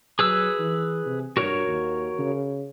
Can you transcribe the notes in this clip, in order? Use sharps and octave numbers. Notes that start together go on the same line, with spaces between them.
F#3 G#4 B4 E6
E3
C3
G2 F#4 A#4 C#5
D#2
C#3